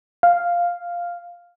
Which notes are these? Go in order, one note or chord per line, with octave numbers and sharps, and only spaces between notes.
F5